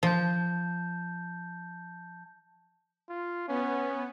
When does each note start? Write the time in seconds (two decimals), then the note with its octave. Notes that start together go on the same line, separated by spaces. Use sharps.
0.03 F3 A5 G6
3.10 F4
3.48 B3 C#4